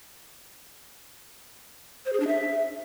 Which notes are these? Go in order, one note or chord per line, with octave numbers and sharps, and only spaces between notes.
C5
G#4
D4
E5